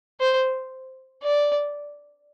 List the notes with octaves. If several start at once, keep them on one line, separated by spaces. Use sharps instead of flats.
C5
D5